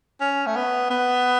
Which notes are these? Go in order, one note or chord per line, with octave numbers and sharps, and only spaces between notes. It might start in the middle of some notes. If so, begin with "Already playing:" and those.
C#4
A3
B3
B3